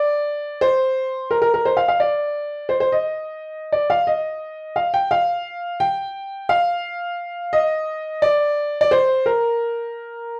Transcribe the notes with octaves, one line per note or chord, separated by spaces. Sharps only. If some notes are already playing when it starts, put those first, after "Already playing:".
Already playing: D5
C5
A#4
A#4
A#4
C5
F5
F5
D5
C5
C5
D#5
D5
F5
D#5
F5
G5
F5
G5
F5
D#5
D5
D5
C5
A#4